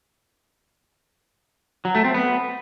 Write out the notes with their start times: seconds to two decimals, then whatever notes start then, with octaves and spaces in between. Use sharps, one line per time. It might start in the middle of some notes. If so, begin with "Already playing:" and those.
1.85 F#3
1.95 A3
2.05 C4
2.14 B3